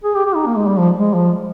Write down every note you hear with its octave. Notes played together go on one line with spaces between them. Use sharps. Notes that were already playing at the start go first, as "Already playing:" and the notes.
G#4
G4
G4
D#4
A#3
G#3
G3
F3
G#3
F3